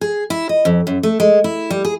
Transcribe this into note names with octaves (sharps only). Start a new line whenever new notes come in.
G#4
E4
D#5
F2
F#2
A3
G#3
E4
G3
G#4